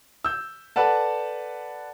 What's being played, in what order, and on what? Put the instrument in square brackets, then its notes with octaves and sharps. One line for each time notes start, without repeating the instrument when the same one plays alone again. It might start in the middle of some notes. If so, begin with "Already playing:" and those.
[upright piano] E6 G6
A4 B4 D5 F#5 A5